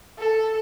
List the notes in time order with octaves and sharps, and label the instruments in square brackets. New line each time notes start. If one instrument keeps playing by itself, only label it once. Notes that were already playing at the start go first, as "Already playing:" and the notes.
[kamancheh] A4